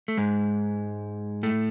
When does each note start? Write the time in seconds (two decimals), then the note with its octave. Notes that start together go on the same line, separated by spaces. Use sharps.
0.08 A3
0.17 G#2 G#3
1.43 A2 A3